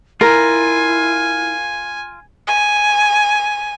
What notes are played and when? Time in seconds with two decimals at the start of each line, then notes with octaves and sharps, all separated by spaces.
0.21 E4 F4 A#4 G#5
2.47 G#5